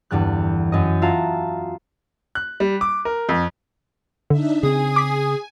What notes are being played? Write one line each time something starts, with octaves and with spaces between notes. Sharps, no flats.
G1 E2 G2 G3 F#6
F#2 D#5
F4 F#4 E5 F5 A5 A#5
F#6
G3
D6
A#4
F2
D3 D4 D#4 E5
C#3 C4 G#4 G#5
D6 B6